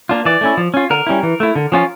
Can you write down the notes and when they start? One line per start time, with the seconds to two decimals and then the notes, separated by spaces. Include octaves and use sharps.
0.09 A#3 D4 F4
0.25 E3 D5
0.41 A3 C#4 E4
0.57 F3
0.74 C#4 F4
0.90 D3 A#4
1.07 G3 C#4 E4
1.23 E3
1.40 A3 E4
1.55 D3
1.72 F3 C#4 F4